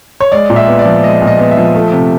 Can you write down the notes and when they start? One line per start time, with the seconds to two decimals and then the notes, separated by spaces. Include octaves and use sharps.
0.21 C#5
0.32 G#3 D5
0.50 A#2
0.56 E5
0.68 B3
0.79 D5
0.86 F3
1.04 G#3 D#5
1.22 A#2
1.27 D#5
1.39 B3
1.51 E5
1.57 F3
1.75 A3
1.92 C3